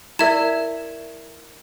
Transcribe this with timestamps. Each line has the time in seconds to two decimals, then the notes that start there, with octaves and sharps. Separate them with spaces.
0.19 E4 A#4 D5 E5 G#6 E7